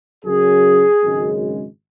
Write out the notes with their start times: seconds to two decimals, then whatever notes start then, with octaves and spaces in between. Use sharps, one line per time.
0.23 F#2 C#3 F#3 G#4
1.02 G#1 F#2 C#3 G#3